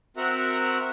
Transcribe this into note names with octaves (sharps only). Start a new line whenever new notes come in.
C4 F#4 A#4 E5 F#5 A#5